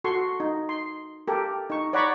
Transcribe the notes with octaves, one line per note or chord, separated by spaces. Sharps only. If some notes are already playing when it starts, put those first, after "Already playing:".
F#4 A4 C6 C#6
D#4
C6
G4 A4 A#4
D#4 C#6
C#5 D5 F#5 A#5 B5 C#6